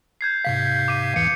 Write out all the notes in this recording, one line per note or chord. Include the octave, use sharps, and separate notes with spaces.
G6 G#6 C7
G#2 C3 F5 B6
D6 D#7
E2 G#2 E3 C#7